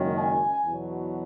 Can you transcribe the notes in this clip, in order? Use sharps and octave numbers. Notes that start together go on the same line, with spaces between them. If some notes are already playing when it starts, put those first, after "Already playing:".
Already playing: F#1 F#2 D#3 G#3 C#4
G#5
E2 B2 F#3